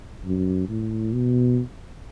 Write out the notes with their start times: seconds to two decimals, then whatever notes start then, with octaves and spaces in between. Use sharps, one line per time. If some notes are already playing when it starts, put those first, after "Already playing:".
0.24 F#2
0.69 A2
1.13 B2